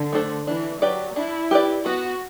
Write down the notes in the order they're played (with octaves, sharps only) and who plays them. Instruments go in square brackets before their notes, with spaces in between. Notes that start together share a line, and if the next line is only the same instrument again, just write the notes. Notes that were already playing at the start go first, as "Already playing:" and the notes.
Already playing: [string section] D3
[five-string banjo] A3 D4 A4 C5
[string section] E3 [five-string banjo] D4
[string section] F#3 [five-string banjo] G4 B4 D5
[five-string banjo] D4 [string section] E4
[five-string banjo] G4 B4 D5
[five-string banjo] B3 [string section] F#4